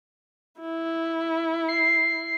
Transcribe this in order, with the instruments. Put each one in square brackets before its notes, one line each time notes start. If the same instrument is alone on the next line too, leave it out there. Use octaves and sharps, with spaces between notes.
[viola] E4
[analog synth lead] C7